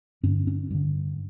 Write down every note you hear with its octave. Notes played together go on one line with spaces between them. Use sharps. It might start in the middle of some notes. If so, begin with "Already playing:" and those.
G2 D3 C#4
C#4
G2 D3